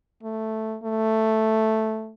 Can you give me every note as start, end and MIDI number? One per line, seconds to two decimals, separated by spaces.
0.23 0.77 57
0.83 2.13 57